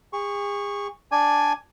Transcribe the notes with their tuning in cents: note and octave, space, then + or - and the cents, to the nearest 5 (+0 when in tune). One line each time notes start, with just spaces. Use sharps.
G#4 -40 C#6 +0
D4 +0 D5 -5 G#5 +0